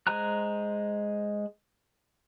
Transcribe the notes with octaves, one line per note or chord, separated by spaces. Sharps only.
G#3 C5 G#5 A#5 F#6